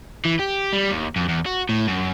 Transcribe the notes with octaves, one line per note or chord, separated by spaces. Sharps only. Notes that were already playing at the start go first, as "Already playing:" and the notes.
E3
G4
G3
D#2
F2
E2
F#4
A2
F#2